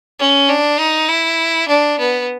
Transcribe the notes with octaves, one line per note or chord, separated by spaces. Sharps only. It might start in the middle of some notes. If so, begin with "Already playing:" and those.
C#4
D4
D#4
E4
D4
B3